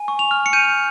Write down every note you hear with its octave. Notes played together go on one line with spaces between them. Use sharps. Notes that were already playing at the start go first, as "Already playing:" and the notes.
Already playing: G#5
C#6
F7
F6
C#7
G6 D#7